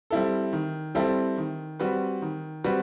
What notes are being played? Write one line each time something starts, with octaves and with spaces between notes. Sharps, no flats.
G3 C4 E4 A4
D#3
G3 C4 E4 A4
D#3
G3 C4 F#4 B4
D#3
G3 C4 F#4 B4